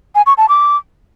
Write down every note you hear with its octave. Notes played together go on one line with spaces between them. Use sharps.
G#5
C#6
A5
D6